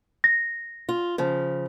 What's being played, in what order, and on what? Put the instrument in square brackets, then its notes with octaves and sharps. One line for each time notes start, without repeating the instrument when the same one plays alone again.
[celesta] A#6
[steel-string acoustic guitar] F4
C#3 F3